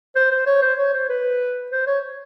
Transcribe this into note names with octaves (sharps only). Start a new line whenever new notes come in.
C5
C5
C#5
C5
C#5
C5
B4
C5
C#5